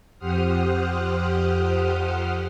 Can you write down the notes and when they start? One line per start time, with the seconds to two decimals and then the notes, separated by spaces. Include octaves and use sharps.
0.18 F2 G4 C5 F#5 D#6 F6